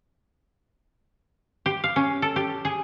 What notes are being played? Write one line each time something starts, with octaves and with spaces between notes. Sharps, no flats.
G4
F5
C#4
A4
G4
G#4